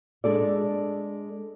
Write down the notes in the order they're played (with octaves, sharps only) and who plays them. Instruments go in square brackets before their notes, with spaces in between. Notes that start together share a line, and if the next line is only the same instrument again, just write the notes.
[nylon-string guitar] G#3 D4 A4 D5